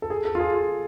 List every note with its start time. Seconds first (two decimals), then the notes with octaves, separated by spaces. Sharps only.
0.02 A4
0.10 G#4
0.25 A4
0.35 F4
0.40 G#4
0.54 F4